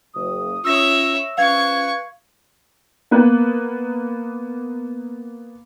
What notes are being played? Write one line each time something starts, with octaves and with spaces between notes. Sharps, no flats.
F#1 D#6
C#4 F4 C#5 E5 E6 A#6
F3 C#4 B4 F5 C#6 G#6
A#3 B3 B4